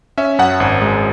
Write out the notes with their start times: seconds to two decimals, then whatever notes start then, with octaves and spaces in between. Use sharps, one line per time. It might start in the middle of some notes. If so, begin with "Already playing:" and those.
0.18 C#4 E5
0.39 F#2 F#5
0.60 G#1
0.82 G#3